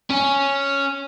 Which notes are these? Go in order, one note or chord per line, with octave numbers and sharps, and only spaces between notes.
C#4